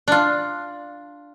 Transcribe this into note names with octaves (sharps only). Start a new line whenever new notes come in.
D4 F4